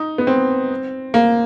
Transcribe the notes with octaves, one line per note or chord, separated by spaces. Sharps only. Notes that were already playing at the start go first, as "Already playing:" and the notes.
Already playing: D#4
B3
C4
A#3